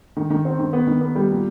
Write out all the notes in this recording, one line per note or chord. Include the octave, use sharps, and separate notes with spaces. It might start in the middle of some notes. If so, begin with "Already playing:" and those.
D#3
D#3
C4
D#3
B3
D#3
B3
G3
A#2